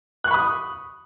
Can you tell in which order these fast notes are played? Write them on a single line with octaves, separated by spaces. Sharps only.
F#6 C#6 B5 D#6